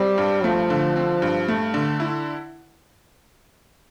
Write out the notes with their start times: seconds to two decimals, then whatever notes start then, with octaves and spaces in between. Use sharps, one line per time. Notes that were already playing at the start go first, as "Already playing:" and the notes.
Already playing: G3 C4
0.18 G2
0.44 F3 A3
0.70 D3
0.96 C4
1.22 G2
1.48 A3
1.74 D3
2.00 E4